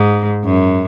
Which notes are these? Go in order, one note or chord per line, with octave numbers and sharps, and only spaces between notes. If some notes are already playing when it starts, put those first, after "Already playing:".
Already playing: G#2
F#2